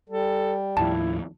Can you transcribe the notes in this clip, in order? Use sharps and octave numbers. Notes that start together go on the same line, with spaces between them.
G3 A4
D#2 A2 F3 E4 A5